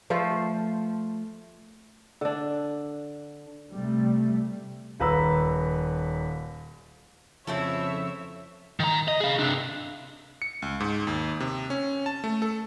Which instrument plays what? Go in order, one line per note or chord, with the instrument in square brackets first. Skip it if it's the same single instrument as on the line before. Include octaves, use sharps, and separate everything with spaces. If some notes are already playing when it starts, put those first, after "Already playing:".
[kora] F3 A3 F4 C5
D3 D4
[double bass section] C3 G3 A3
[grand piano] D#1 B4 A#5 E6
[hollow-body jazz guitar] F2 C#3 F4 [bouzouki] C4 E4 A4 [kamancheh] C#5 E5
[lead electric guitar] D#3 A#5
D#5
G#4 F5
C3 D4
[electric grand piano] C#7
C#2
G#2
D#2
C3
C#4
A5
A3
A4